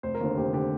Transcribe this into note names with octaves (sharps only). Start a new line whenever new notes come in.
F1 C5
A#4
D#2 D3
F1 G4
D3 G4